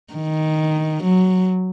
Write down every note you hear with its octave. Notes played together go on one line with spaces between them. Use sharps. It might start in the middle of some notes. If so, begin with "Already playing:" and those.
D#3
F#3